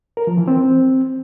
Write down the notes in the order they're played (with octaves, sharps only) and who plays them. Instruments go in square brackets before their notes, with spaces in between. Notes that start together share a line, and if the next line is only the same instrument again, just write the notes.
[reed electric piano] A#4
F3
E3
C4